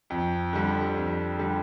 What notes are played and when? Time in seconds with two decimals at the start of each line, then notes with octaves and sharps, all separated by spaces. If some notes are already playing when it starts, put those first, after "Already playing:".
0.10 F2
0.53 D3 G3
0.96 F2
1.38 D3 G3